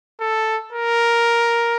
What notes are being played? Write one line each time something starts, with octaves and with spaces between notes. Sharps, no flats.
A4
A#4